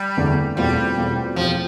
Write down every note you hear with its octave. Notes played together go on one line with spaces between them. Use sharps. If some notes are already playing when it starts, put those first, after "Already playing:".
Already playing: G3
E2 D3 A3
E2 B2 G3 A3 C4 F4
E2 B2 A3 C4 F4
E2 B2 F3 A3 C4 F4